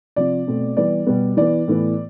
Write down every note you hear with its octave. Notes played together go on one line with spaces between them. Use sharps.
C3 F3 C4 D5
B2 A3 C4
E3 G3 B3 D5
B2 G3 B3
E3 B3 D5
A2 E3 B3